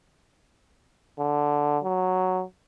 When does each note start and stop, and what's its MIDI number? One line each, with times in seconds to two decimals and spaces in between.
1.19 1.79 50
1.84 2.43 54